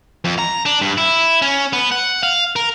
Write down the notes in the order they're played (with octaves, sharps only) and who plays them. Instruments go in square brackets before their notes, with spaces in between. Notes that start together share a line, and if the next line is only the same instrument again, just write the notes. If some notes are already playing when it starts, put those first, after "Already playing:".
[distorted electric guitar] F2
A#5
D4
G2
E4
C#4
B3
F#5
F5
A#4